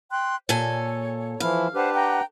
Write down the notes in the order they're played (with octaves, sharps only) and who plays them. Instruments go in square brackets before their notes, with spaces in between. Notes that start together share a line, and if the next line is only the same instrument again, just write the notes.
[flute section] G5 C6 F#6
[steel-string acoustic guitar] A#2 A4 G#5 [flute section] C#5
[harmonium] E3 F3 E4 [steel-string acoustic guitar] F5
[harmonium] D4 G4 B4 [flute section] C5 F#5
[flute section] F#5 G5 A#5